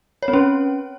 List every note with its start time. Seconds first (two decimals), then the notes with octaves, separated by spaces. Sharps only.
0.23 C#5
0.28 C4
0.33 C#4